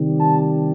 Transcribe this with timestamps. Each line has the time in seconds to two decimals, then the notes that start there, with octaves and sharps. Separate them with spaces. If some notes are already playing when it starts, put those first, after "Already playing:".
Already playing: C3 D#3 G3
0.19 A5